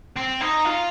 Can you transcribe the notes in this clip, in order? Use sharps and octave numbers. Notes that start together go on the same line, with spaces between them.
C4
D#4
F4